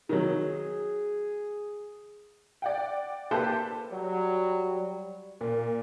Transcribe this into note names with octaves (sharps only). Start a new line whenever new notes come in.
D#3 F#3 G#4
D5 F#5 G5
A#3 G4 A4 B4 C5
F#3 G3
A#2